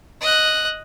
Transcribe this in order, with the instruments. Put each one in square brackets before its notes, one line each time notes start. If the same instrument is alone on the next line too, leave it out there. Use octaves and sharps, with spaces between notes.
[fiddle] D#5 F#6